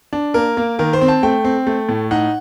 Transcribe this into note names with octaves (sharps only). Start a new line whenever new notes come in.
D4
A#3 A#4
A#3
D#3 A#4
C5
C4
A5
A3 G5
C4
A3
A2
D#4 F#5